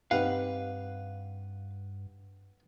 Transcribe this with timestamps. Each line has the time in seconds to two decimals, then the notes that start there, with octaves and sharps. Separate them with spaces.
0.11 G2 C4 D#4 G4 B4 F5 F#5